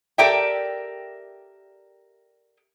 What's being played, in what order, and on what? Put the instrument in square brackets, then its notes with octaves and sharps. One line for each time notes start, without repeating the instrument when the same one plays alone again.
[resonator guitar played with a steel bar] G4 A4 A#4 D5 E5 G5